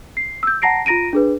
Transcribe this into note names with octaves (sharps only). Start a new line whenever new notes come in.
C7
E6 G6
F#5 A5 A#5 A#6 C7 D7
F4 A#5 A#6 D7 D#7
D4 G#4 B4